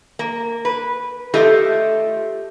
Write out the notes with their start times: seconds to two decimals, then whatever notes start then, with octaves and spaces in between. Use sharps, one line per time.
0.19 A#3
0.65 B4
1.34 A3 F4 G4 D#5